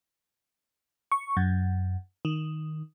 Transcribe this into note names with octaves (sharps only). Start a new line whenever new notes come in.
C#6
F#2
D#3